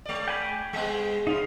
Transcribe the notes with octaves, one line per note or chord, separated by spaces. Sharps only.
G#3 D5
G5 G#5 B5
G3 G#3 B3
C#3 D#4 F4 C5